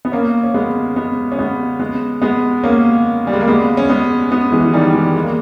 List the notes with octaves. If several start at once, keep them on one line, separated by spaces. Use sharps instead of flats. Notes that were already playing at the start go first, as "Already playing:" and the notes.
B3
A#3 C#4
C#4
G#3 B3
G#3 B3
C#4
G#3 B3
G#3 B3
G#3 B3
A#3 C#4
G3
G#3
A#3
G#3 B3
C#4
G#3 B3
G#3 B3
E3 G#3
E3
D#3 G3
E3 G#3
G#3
A#3